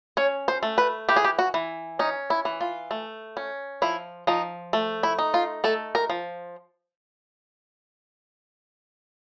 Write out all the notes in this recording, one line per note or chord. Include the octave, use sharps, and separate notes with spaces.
C#4 C#5
C5
A3
B4
E3 G4
G#4
G4
F#4
E3
C#4 D#4
E4
E3
F4
A3
C#4
F3 E4
F3 D#4
A3
E4
D#4
F4
A3 A4
A#4
F3